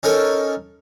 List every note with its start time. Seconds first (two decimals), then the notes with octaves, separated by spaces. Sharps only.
0.03 C#4 D#4 A4 A#4 C#5